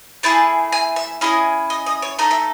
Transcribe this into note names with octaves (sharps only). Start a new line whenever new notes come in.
A3 E4 G#4 A5
G#5
E5
C#4 E4 G#4 D#5
D#5
D#5
C#5
A3 D#4 A4 D#5
E5